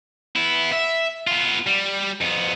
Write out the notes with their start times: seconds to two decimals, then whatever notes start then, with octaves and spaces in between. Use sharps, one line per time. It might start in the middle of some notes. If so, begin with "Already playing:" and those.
0.36 B3 E4
0.72 E5
1.27 B3 F4
1.66 G3
2.21 F2 B3